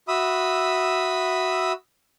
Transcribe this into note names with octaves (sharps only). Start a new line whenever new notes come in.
F#4 E5 B5 D#6 E6